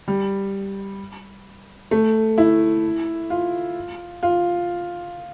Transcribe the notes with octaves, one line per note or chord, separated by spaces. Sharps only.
G3
A3
E4
F4
F4